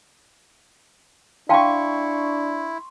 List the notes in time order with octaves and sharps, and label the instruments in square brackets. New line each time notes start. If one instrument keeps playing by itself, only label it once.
[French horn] D4 [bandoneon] E4 [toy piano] F5 G5 A5 [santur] C6 C#6